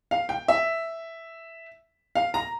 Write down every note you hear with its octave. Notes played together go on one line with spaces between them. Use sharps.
F5
G5
E5
F5
A#5